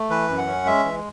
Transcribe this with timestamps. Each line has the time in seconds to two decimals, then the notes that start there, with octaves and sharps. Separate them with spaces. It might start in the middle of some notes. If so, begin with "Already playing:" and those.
Already playing: A3
0.10 E3 B4
0.29 F#2
0.38 F#5
0.47 C#4
0.66 G#3 E5
0.84 E3